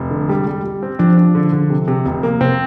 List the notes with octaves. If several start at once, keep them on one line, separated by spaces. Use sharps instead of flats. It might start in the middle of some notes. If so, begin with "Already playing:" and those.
Already playing: F1
D3
G3
G3
G3
C4
F3 D4
D4
D3
D3
C3
C3
F1
A#3
C3 C4